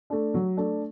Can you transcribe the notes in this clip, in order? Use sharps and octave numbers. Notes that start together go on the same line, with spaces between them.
A3 D4
F#3
A3 D4